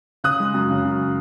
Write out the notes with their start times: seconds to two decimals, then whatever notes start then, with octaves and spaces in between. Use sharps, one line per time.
0.24 C#3 D#6 F#6
0.40 G#3
0.54 F#2
0.70 C#3
0.85 F#2